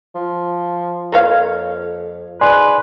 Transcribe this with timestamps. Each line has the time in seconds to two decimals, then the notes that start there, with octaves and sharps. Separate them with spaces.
0.15 F3
1.12 F2 A#3 C#5 F5
2.41 G#2 B4 D5 G#5 C6